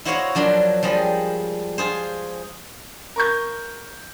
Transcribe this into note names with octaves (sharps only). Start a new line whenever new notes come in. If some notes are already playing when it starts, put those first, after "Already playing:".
E4 F#4 C5 C#5 D#5 F5
F3 F#3 D4 A#4 C6
F3 G3 G#3 D#5
F4 G#4 C5
A#4 C#6 G6